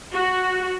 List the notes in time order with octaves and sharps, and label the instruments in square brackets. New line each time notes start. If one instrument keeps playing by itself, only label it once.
[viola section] F#4